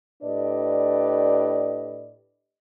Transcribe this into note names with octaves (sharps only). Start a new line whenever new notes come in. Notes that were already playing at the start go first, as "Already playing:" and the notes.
A2 D4 G4 B4 D5 D#5